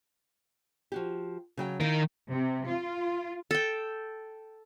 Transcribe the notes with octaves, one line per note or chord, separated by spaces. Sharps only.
F3 F#4 G4
C#3 F#3 G5
D#3 D#4 E4 A#4 F5
C3
F4
A4 G5